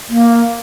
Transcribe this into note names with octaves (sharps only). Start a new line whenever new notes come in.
A#3